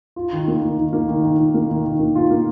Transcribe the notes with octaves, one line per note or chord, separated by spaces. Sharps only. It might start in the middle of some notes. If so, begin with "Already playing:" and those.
F4
D#3
A#3
D#3
D#3
A#3
D#3
D#3
D#3
A#3
D#3
D#3
A#3
F4
A#3